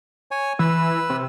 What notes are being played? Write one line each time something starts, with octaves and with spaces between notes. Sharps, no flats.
C#5 G#5
E3 B4 E6
C3